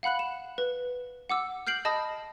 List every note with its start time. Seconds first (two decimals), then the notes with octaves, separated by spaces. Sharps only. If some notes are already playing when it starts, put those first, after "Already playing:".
0.03 F5 F#5 B5 F#6 F#7
0.19 E7
0.58 B4
1.30 F#5 D6 E6
1.67 F6 G6 C7 D7 F#7
1.85 D#5 A5 B5 D#6 A#6